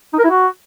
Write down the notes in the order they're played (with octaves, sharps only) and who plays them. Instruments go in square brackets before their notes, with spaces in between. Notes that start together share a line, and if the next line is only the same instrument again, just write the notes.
[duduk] D#4
A#4
E4
F#4